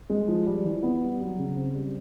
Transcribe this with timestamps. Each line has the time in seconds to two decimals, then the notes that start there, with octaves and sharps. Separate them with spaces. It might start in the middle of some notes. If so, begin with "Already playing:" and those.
0.10 G#3
0.28 F3
0.47 G3
0.64 E3
0.83 B3
1.02 G3
1.20 F#3
1.38 C#3
1.56 C4
1.75 G3